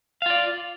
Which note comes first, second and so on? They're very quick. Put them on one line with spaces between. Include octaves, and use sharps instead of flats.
F5 F4 D5